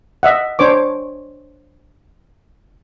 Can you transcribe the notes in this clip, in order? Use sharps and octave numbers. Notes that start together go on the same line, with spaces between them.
D#5 E5 F#5
D4 C5 C#5 D6